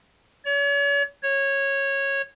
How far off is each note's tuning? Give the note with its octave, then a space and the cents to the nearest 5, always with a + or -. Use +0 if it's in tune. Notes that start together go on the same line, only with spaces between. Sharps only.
C#5 +40
C#5 -15